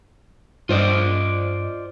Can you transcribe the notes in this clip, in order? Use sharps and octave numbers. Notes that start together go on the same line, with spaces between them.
G2 F4 C5 D5 D#5